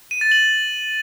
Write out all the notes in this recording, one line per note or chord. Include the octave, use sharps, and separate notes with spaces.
D#7
A6
F#7